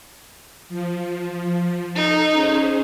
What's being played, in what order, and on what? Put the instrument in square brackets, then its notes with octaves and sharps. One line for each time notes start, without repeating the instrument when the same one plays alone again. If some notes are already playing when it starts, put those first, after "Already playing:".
[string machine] F3
[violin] D#4 [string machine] A4
[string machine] C#4 G#4 C5